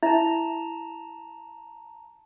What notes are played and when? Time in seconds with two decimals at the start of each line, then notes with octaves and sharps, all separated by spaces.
0.03 E4 E5 A5 A#5